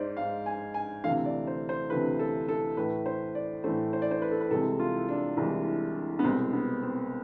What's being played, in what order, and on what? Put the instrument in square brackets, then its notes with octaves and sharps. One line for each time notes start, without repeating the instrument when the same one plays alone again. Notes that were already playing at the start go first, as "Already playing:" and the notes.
Already playing: [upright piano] G#2 G#3 C5 D5
G#2 G#3 F5
G#5
G#5
D2 C3 E3 A3 F5
D5
C5
C5
D2 C3 E3 A3 B4
A4
A4
A2 E3 A3 B4
C5
D5
A2 E3 A3 C5
C5
D5
C5
B4
A4
B4
C2 C3 E3 G#3 A4
F4
D4
C2 C3 E3 G#3
B3
C2 B2 G#3 C4
B3
C4